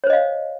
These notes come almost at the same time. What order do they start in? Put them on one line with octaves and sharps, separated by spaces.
C#5 C5 D#5 F5